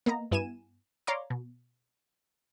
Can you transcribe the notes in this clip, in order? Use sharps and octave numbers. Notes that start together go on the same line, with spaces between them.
A#3 B3 D#5 A#5
G2 B3 E4 G#5 D#7 E7
C#5 D5 F5 A#5 C6 D6
B2